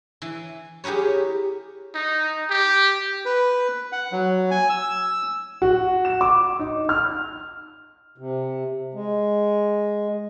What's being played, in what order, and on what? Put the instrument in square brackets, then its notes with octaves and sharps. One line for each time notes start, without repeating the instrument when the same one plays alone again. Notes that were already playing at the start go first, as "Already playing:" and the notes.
[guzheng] E3
G4 G#4 A#4 B4 C#5
[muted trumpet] D#4
G4
[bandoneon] B4
F#5
F#3
G#5
E6
[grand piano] F#4
E7
D6
D#4
F6
[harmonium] C3
G#3